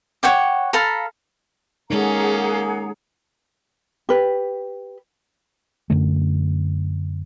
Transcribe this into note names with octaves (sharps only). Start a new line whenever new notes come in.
C#5 F#5 G5 D6
A4 F5 A#5 B5
G#3 A#3 C#4 D#4 G#4 A4 F#5 A#5
G4 B4
F#2 D3 A3